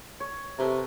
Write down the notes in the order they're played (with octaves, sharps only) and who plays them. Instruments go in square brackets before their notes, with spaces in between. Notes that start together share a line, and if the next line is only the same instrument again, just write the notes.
[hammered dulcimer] C#5
[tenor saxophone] C3 [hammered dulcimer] A4 B4 A#5